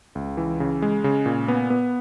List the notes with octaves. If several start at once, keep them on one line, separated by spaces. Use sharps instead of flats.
C#2
E3
C#3
G#3
C#3
A#2
B3
B3